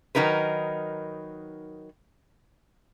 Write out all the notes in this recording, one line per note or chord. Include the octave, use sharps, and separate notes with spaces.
D#3 F#3 D#4 A#4 B4